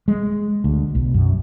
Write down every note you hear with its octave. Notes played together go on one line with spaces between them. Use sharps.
G#3
D2
B1
F#2